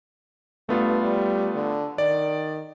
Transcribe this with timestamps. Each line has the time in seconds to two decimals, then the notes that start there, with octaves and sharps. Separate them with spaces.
0.69 G2 A3 B3 F4
1.02 G3
1.55 D3
1.98 D#3 D5